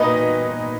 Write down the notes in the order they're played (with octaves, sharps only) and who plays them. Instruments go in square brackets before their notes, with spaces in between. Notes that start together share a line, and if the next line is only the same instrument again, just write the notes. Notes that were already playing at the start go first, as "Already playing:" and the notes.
Already playing: [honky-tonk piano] A#2 D#4 B4 D#5